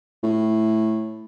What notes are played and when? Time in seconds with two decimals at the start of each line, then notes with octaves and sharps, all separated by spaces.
0.23 A2